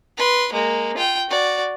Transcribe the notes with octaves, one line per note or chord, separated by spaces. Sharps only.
B4 C6
G#3 A#3
F4 G5
F#4 D5